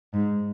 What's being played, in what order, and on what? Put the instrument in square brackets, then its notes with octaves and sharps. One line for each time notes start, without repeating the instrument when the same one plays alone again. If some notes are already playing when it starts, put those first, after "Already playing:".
[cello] G#2